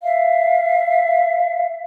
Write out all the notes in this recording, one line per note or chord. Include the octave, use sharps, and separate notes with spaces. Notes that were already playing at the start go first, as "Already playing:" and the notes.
E5 F5